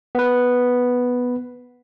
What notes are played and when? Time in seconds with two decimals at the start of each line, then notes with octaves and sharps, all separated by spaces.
0.15 B3 B4